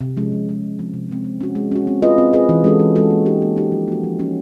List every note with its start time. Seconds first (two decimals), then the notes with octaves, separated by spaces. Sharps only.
0.01 C3
0.17 F3 G#3 C#4
0.32 C3
0.47 F3 G#3 C#4
0.63 C3
0.79 F3 G#3 C4
0.94 C3
1.09 F3 G#3 C4
1.24 G#3
1.41 C#4 F#4
1.55 G#3
1.71 C#4 F#4
1.87 C4
2.02 F4 G#4 B4 D#5
2.18 C4
2.33 F4 G#4 B4 D#5
2.49 E3
2.64 G#3 C#4 F#4 A4
2.79 E3
2.95 G#3 C#4 F#4 A4
3.10 A#3
3.26 D#4 G4
3.42 A#3
3.56 D#4 G4
3.72 F3
3.88 A#3 C#4 F#4
4.03 F3
4.19 A#3 C#4 F#4